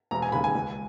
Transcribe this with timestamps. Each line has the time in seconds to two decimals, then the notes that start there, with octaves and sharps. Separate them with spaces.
0.11 E1 A#5
0.22 G#5
0.32 D#2 C#3 B5
0.44 G#5
0.55 C#2